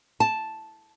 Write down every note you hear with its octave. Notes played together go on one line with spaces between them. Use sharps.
A5